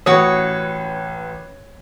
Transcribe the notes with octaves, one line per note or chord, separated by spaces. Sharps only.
A1 F#4 B4 C#5 D#6